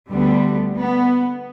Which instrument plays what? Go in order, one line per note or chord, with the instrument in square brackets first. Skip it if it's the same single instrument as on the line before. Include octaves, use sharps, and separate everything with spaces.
[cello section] D2 D3 G3 B3
B3